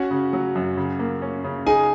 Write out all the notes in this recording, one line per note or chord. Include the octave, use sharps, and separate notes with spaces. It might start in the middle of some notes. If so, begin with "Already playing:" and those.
Already playing: C#4 F#4 F#5
C#3
F#3
F#2
C#3
A#3
C#4
C#3
D#4 G#4 G#5